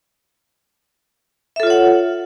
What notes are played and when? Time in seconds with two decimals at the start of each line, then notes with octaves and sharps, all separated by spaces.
1.56 E5
1.60 A4
1.63 F4
1.67 C#5
1.70 F#5